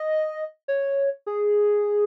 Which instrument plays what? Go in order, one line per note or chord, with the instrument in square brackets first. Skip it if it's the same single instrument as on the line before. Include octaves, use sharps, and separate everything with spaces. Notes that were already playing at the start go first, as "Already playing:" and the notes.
Already playing: [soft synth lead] D#5
C#5
G#4